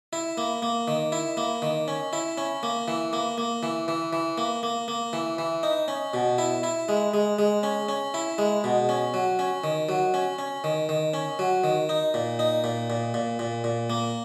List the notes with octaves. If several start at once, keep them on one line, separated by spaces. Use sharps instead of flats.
E4
A#3
A#3
D#3
E4
A#3
D#3
C#4
E4
C#4
A#3
E3
A#3
A#3
E3
E3
E3
A#3
A#3
A#3
E3
E3
D#4
C#4
B2
E4
E4
G#3
G#3
G#3
C#4
C#4
E4
G#3
B2
C#4
F#3
C#4
D#3
F#3
C#4
C#4
D#3
D#3
C#4
F#3
D#3
D#4
A#2
D#4
A#2
A#2
A#2
A#2
A#2
A#3